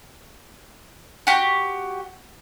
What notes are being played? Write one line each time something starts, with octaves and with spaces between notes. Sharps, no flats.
F#4 G4